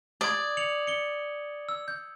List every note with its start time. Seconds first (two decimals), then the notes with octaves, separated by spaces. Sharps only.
0.21 D5 D#6 G#6
0.57 C#7 F7 F#7
0.87 C#7 G7
1.69 E6
1.88 G6